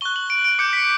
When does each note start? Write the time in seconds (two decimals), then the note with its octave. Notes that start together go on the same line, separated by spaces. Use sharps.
0.01 C#6 F#6 G7
0.16 F#7
0.30 D7
0.44 D7
0.59 D6 G6 C#7
0.73 B6